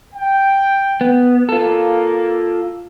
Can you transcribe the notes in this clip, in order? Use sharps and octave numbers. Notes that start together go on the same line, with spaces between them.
G5
B3
A#3 F4 A4